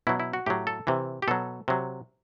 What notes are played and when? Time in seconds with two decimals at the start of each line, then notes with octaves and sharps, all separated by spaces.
0.07 B2 F#3 E4
0.20 E4
0.33 F#4
0.46 A2 F#3 G4
0.67 A4
0.87 C3 E3
1.22 G4
1.28 B2 F#3 A4
1.68 C3 F#3